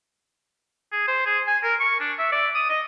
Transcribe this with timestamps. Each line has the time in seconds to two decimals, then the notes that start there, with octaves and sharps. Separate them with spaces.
0.92 G#4
1.08 C5
1.26 G#4
1.47 G#5
1.63 A#4
1.80 C#6
2.00 D4
2.19 E5
2.32 D5
2.55 D#6
2.70 D#5